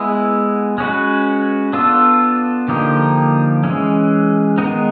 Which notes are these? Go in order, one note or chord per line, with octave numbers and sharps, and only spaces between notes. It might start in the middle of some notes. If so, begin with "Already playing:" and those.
Already playing: G#3 B3 E4
G#3 C#4 F#4 B4
B3 D4 F4 A4
D3 F3 A#3 D#4 G4
E3 G#3 C#4
D#3 G#3 B3 D#4